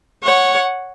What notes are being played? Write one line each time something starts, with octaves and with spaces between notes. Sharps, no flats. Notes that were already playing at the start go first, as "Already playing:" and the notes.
C#5 F#5